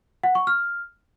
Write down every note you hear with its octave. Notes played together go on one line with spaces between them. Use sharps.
F#5
C#6
F6